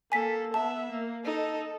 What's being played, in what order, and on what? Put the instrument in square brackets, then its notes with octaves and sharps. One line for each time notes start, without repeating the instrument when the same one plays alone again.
[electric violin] A#3 A4 [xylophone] G#5 B6
[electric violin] B3 E5 [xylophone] A5
[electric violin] A#3
[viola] D#4 [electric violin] A4